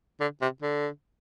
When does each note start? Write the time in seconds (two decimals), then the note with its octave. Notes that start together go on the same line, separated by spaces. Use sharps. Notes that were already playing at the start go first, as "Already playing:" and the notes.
0.20 D3
0.41 C3
0.62 D3